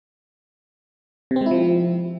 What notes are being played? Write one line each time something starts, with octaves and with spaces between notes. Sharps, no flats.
C3
C4
G#3
E4
F3